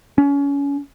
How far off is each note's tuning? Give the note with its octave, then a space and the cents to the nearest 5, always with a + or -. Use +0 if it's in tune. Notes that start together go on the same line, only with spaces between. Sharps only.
C#4 +30